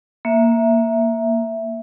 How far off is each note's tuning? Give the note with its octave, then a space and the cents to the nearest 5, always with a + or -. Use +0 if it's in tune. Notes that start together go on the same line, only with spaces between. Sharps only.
A#3 +0 E5 +0